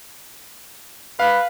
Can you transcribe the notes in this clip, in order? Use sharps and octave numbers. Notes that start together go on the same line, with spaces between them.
B4 F5